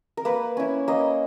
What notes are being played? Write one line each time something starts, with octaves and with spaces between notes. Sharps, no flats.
A#4
A#3 B4
C#4 E4
A#3 D#5